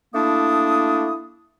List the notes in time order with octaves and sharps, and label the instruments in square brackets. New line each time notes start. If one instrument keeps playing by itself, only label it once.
[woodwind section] A3 A#3 D4 E4 D#6